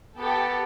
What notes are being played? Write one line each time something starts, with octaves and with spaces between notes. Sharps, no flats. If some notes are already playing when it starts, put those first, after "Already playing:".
B3 G4 A4